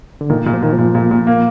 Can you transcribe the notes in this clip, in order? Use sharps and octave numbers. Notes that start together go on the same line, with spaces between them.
D3
A#2 D#3
A#2
F3
A#2 D#3
F3
A#2
A#2
A#2
A#3